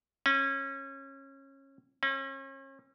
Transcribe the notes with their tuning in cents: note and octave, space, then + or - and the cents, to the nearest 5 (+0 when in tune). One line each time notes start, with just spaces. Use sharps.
C#4 -25
C#4 -40